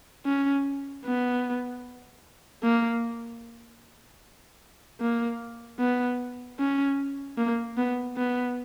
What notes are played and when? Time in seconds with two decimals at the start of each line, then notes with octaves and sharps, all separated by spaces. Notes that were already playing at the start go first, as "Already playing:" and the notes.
0.26 C#4
1.05 B3
2.63 A#3
5.01 A#3
5.80 B3
6.59 C#4
7.38 A#3
7.77 B3
8.17 B3